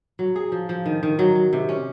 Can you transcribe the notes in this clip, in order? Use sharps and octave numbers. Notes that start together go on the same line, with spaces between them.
F#3
G#4
F3
F3
D#3
D#3
F#3
F#3
C3
C#4